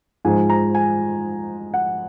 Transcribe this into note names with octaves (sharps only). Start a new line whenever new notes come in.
G#2 F3 G#3 G#5
A#5
G#5
F#5